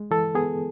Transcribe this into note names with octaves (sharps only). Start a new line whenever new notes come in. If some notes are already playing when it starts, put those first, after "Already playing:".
Already playing: G#3
E3 A4
B3 G#4